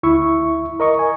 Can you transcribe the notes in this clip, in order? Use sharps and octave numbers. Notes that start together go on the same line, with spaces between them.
D2 E4 E5 C#6
A#4 D#5 C#6
G#5